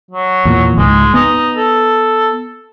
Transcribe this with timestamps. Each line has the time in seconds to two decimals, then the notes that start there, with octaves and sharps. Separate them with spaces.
0.11 F#3
0.45 E2 A#2
0.78 C#2 G#2 G#3
1.14 B3 D#4
1.57 A4